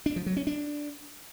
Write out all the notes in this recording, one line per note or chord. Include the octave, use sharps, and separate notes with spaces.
D4
F3
F#3
C#4
D4